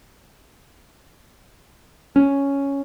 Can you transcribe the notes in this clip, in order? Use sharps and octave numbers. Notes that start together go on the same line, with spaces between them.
C#4